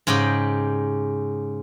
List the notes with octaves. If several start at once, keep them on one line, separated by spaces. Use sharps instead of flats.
G#2 C#3 G4 D#5 G5